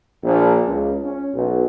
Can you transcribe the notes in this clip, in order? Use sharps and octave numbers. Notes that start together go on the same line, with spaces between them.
A#1
C#2
C#4
B1